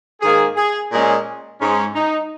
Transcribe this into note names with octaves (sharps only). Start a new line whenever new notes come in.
G#2 D#3 A#3 G#4
G#4
A#2 G#3 C#4 G#4
G#2 G#3 C#4
D#4